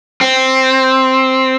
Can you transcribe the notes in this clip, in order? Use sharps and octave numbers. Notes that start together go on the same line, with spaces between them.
C4